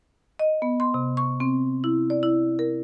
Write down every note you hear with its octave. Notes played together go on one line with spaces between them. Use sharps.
D#5
B3
C6
C3
C#6
C4
E4
D5
E4
A#4